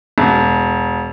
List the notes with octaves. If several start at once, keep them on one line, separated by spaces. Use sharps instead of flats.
E1